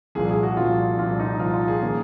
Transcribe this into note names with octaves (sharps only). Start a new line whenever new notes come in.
C2 A#2 F3 G#4
G#4
F#4
C2 A#2 F3 F4
C2 A#2 F3 F4
D#4
C2 A#2 F3 F4
F4
G#4
D#3 A#3 C#4